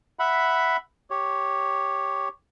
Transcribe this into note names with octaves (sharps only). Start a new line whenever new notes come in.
E5 F#5 B5
G4 C#5